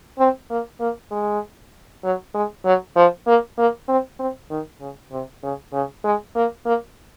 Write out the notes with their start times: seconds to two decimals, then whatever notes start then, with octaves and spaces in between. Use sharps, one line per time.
0.18 C4
0.50 A#3
0.80 A#3
1.11 G#3
2.04 F#3
2.34 G#3
2.65 F#3
2.96 F3
3.27 A#3
3.58 A#3
3.88 C4
4.19 C4
4.51 D#3
4.81 C#3
5.11 C3
5.43 C#3
5.73 C#3
6.04 G#3
6.35 A#3
6.65 A#3